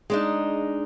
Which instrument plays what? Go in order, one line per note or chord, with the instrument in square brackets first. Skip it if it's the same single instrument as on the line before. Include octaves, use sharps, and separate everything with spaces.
[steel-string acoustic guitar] G#3 D4 D#4